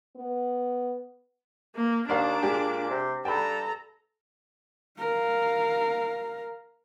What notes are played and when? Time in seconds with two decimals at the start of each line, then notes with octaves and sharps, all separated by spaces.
0.16 B3
1.75 A#3
2.09 D#2 D4 A#4 D5 F5 D6
2.43 A#2 G#3 G4
2.90 C3
3.25 G2 A4 G5 A#5 B5
4.99 A#4 F5